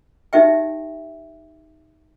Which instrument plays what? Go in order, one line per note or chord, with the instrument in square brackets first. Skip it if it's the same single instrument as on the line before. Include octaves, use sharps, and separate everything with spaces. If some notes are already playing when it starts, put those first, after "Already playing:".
[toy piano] D#4 G4 E5 G5